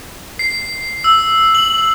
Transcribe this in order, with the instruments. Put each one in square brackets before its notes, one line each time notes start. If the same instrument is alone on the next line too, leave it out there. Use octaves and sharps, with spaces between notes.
[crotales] C7
E6
F#7